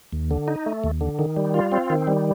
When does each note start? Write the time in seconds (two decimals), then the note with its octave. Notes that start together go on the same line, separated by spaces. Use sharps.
0.12 D#2
0.31 D3
0.48 D#4
0.66 A3
0.84 D#2
1.01 D3
1.19 D#3
1.37 G3
1.54 F4
1.72 C4
1.90 D#3
2.07 G3